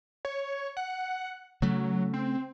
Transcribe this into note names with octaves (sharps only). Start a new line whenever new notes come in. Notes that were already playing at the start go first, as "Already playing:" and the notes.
C#5
F#5
C#3 F#3 A3
C4